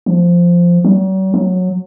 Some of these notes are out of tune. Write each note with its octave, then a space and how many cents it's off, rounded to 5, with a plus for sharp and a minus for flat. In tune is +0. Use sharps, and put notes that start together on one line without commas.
F3 -5
F#3 +45
F#3 -15